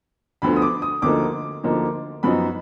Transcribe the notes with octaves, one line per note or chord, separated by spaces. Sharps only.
D2 D3 F3 B3 B5
D#6
D6
D#6
D2 D3 F3 A#3 D#4 D6
D2 D3 F3 A#3 D#4
F#2 F3 B3 D#4 B5